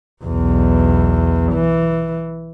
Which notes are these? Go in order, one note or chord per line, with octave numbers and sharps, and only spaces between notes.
B1 E2
E3